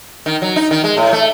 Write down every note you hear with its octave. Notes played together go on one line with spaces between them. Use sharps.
D#3
F#3
D#4
D#3
G#3
A2
A3